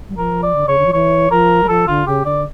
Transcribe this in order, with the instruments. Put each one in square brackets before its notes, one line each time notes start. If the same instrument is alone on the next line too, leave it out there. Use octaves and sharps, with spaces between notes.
[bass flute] G3
[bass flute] F3 [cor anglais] A#4
[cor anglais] D5
[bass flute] D3
[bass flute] C#3 [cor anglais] C#5
[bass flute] D3
F3
[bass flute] E3 [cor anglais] C#5
[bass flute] F3 [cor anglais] A#4
[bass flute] G3
[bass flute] F3 [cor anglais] A4
[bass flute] D3 [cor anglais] F4
[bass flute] C#3 [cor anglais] G4
[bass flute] D3 [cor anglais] D5